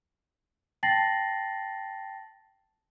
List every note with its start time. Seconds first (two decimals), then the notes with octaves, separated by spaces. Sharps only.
0.83 G5 A5 A6 A#6 C7 F#7